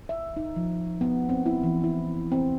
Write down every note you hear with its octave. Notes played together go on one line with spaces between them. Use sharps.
E5
D#4
F3
B3
C4
E4
E3
E4
C4